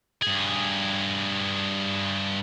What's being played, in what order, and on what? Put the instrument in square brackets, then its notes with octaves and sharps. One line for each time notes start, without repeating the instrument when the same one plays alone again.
[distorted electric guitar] G2 G#4